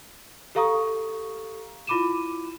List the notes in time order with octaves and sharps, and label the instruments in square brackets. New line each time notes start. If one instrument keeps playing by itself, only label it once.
[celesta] G4 A4 F5 A#5 C#6 D#6
E4 F4 B5 D6 D#7 E7